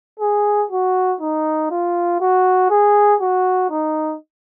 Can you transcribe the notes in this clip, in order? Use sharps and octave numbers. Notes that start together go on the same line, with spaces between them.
G#4
F#4
D#4
F4
F#4
G#4
F#4
D#4